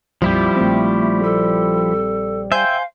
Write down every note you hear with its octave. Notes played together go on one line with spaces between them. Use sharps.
A#1 F2 F3 G3 E4 G4
A#1 A3 C4
A4
C5 E5 F5 G5 G#5 G6